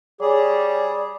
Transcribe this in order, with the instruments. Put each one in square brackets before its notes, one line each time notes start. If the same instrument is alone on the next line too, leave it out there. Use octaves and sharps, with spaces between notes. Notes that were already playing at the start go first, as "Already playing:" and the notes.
[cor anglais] G3 [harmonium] G#4 [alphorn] C#5 [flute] D5